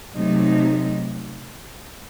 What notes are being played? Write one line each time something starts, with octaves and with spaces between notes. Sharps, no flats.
C3 F#3 A3 D#4